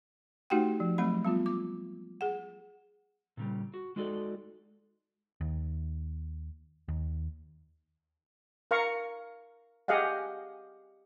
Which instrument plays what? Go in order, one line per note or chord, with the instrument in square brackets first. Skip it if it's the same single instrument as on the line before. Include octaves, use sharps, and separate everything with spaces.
[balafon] A3 D#4 F#4 G4 F#5 G5
F3
F#3 A3 C4 B5
G3 B3 F4
D6
G#4 F#5
[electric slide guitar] A#2 C#3 G3
F#4
G#3 D#4 F#4 A4 D5
[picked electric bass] D#2
D#2
[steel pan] A#4 F5 A#5 C#6
G4 G#4 D#5 F5 F#5